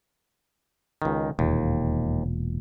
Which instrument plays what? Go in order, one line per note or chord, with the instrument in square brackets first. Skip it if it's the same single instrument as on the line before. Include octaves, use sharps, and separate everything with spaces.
[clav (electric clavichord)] C#2 D#3
[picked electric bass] E1 A#2 [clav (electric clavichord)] D#2